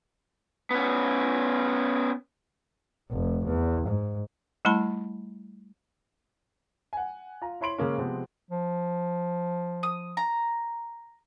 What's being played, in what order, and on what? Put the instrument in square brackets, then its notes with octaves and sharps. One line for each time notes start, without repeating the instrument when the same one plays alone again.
[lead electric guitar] B3 C#4
[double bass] F1
E2
G#2
[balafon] G3 A3 E4 A5 B5
[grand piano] F#5 G#5
F4 A#5
E4 C#5 B5 C6 D7 F#7
C#3 G#3 A#3 C#4
C3 F3 G#3 B3 C4
[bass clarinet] F3
[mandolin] D#6
A#5